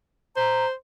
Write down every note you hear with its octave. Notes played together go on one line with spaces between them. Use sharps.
C5 A#5